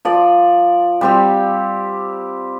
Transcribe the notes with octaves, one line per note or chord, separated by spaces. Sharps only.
F3 D5
G3 C4 G4